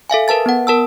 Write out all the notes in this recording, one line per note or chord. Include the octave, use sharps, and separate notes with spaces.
A4 E5 F5 G#5
A#4 B4 A5 A6
B3 F#5
A#4 A5 E6